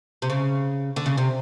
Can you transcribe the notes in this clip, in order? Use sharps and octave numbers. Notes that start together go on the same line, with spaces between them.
C3
C#3
D3
C#3
C3